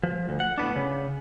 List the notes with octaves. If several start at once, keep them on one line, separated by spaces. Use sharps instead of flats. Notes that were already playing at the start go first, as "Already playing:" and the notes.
F3
D2
F#5
A2 B3 D4
C#3